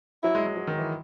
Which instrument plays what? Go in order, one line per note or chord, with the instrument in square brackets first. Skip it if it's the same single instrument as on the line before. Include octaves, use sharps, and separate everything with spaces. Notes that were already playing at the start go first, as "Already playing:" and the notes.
[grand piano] F#3 [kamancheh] E4
[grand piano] G#3
G#3
F#3
D#3
E3